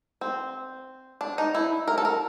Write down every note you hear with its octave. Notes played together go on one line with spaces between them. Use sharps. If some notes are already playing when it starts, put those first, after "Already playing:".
C4
D4
D#4
E4
A#4
A4
A#4